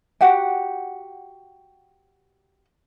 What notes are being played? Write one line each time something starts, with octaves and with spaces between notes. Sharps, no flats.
F#4 G4 F#5 G5